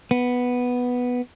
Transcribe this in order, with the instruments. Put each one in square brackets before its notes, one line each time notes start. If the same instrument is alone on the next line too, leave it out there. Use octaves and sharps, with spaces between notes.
[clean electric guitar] B3